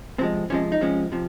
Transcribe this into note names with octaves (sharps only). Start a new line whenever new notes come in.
C3 F3 G#3 C4
C3 F3 G#3 C#4
D#4
C3 F3 G#3 C#4
C3 F3